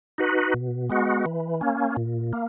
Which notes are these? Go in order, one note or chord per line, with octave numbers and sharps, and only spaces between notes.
D#4 F#4 B4
B2
G#3 B3 F#4
E3
A#3 C#4
A#2
A#3